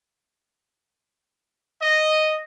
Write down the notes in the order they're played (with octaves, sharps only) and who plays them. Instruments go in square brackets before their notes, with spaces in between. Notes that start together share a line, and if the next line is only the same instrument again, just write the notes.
[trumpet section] D#5